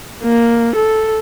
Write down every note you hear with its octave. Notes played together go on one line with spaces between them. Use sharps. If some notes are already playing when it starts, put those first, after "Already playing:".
A#3
A4